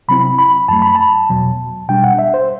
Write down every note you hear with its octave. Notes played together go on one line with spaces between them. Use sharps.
C3 F#3 C4 E4 B5
B5
F#2 F#3 A3 A5
B5
A5
E2 B2 F#3
B2 G3 D4 G5
F#5
E5
C5